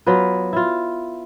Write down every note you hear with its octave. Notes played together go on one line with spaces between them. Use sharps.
F#3 B3 F4 B4
E4 F4